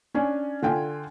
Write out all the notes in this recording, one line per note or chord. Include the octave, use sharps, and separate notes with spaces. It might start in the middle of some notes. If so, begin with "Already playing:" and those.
C#4 D4 G#5
D3 F4 G5 G#5